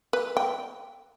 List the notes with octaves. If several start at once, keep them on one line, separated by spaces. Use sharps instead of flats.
B4
G5